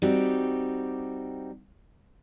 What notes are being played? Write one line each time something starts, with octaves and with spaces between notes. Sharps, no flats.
G3 C4 D#4 F#4 G4